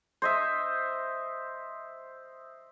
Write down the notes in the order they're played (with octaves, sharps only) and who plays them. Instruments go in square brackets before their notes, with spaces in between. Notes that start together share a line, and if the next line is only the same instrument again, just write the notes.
[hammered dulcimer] C5 D#5 E5